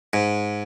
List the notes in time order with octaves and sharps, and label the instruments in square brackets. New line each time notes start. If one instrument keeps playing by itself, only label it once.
[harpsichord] G#2